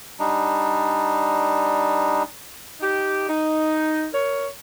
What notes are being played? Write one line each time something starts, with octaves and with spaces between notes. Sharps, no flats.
G3 D4 D#4
D#4 G4
D#4
A#4 C#5